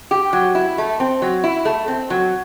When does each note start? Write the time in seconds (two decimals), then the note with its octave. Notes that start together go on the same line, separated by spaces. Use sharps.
0.11 G4
0.33 F#3
0.55 E4
0.78 A3
1.00 C4
1.22 F#3
1.44 E4
1.65 A3
1.88 C4
2.10 F#3